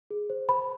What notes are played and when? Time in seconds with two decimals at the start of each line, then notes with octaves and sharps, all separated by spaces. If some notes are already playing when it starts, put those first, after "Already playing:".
0.11 G#4
0.30 C5
0.49 C5 B5